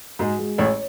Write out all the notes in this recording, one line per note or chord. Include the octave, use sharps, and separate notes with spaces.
G#2 G#3 F#4
G#3
A1 A2 C#5